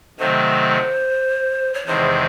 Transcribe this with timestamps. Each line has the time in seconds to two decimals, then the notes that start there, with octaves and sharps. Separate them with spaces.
0.19 C3 D#3 F#3 A3 C5
1.74 C#5
1.86 E2 C3 D#3 G#3 C5